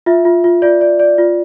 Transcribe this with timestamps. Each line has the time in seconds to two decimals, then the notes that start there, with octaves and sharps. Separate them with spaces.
0.06 F4 E5
0.25 F4
0.44 F4
0.62 F4 D5
0.81 D5
0.99 D5
1.18 F4